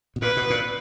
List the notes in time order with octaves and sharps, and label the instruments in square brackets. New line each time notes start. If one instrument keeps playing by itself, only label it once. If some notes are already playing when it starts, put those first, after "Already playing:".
[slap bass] B2
[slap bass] A#2 [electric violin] B4
[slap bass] B2
A#2